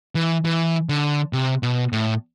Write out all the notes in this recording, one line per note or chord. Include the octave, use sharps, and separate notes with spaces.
E3
E3
D3
C3
B2
A2